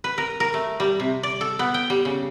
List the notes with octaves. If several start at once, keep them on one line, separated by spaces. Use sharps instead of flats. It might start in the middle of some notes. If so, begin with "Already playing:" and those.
B4
A#4
A#4
A3
G3
C3
D5
A4
B3
G5
G3
C#3